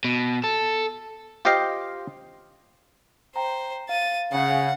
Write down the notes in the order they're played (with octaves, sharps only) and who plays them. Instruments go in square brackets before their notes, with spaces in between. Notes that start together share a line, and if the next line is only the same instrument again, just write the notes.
[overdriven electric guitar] B2
A4
[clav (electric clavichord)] F4 G4 C5 D#5 F5 G5
[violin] C5 [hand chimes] G5 A#5
[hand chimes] F5 [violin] A6 D#7
[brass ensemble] C#3 [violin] F#5